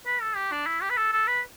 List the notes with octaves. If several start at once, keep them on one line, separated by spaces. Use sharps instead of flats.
B4
A4
G4
D4
E4
G4
B4
A4
A4
B4